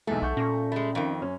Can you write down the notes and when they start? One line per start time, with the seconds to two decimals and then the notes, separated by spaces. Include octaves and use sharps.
0.07 B1 E2 G#3 A3 A4
0.22 B1 F#5 C#6 G6
0.37 A#2 C#4 C#6 A#6
0.72 G#3 A3 B5
0.95 F2 D#3
1.22 F#2 C#4